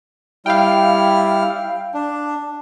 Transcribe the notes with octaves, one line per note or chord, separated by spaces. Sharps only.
G3 E4 F5 G5 F6
D4